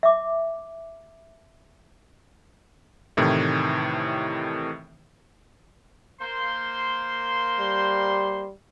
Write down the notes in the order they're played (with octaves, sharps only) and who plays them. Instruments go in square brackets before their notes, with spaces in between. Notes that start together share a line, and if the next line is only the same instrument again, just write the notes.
[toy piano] E5 D6
[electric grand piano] A2 C3 D#3 E3 A3
[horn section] A#3 C5 C6
[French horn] G3